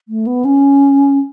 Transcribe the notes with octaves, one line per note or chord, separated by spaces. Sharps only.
A3
B3
C#4